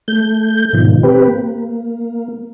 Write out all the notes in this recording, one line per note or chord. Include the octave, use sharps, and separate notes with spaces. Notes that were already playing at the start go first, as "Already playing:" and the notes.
A3 G6
G#2 B2 D#3 F3
C4 G4 B4
A#3